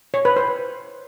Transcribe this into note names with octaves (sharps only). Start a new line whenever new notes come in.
C#5
B4
C5